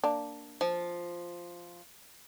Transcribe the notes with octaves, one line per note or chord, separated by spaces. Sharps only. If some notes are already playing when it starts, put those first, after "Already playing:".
A#3 D4
F3